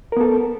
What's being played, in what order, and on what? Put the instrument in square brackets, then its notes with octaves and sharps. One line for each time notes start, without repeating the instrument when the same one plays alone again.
[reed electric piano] A#4
B3
A4